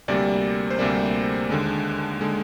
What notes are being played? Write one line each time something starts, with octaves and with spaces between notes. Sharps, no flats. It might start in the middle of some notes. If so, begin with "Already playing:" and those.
D2 C3 G3 A#3 D5
C5
D2 C3 G3 A#3 D5
D#2 D3 G#3
D3 G#3